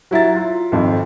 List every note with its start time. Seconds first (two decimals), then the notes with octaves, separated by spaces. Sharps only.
0.11 F#3 E4 A#5 A6
0.35 F4
0.72 G#1 F2